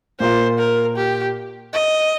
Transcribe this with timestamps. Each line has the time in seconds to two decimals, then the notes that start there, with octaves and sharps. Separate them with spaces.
0.20 A#2 A#3 F4 C5
0.59 A#4
0.97 G4
1.74 D#5